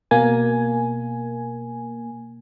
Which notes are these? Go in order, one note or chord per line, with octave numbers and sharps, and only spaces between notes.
B2 A#3 G#5